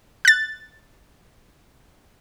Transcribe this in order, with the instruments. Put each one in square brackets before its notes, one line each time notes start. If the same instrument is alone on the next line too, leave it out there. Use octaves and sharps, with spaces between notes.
[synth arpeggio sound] F#6 A6